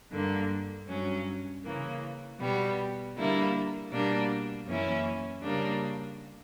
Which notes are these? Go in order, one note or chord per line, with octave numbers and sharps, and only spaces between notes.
G2 D3 A#3
G2 F#3 C#4
C#3 E3 A#3
B2 G3 B3
D3 G3 A#3 E4
B2 G3 A#3 D4
F#2 E3 A#3 C#4 E4
C#3 G3 A#3 D4